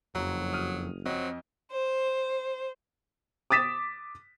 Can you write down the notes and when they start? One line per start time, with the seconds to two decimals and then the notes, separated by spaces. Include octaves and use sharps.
0.15 F#1 F2 F#3 A#5
0.53 D#6 F6 D#7
1.06 F2 F#3 C4 D#5
1.72 C5
3.50 D6 D#6 A6 B6 E7